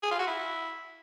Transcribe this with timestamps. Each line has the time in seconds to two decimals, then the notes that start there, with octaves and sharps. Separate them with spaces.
0.03 G#4
0.11 F4
0.19 F#4
0.27 E4